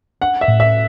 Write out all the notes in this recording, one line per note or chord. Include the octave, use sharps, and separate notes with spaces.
D4 F#5
E5
A2
E5